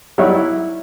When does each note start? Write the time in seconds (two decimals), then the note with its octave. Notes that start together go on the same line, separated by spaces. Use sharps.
0.18 F#3 G3 D#4 E4 C#5 D5
0.35 E4